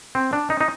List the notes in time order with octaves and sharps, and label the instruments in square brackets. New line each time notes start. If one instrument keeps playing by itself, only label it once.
[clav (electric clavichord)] C4
D4
D#4
D#4